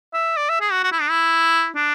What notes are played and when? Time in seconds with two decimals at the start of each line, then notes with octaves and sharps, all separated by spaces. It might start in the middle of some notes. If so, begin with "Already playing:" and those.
0.14 E5
0.37 D5
0.49 E5
0.61 G#4
0.71 F#4
0.83 F#4
0.92 E4
1.01 D4
1.10 E4
1.75 D4